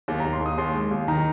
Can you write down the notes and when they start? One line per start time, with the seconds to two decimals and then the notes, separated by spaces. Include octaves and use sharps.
0.08 D#2
0.20 A#5
0.25 D#2
0.33 C6
0.40 D#2
0.46 D#6
0.58 D#2 C6
0.74 G#3
0.91 D#2
1.08 D#3 A#5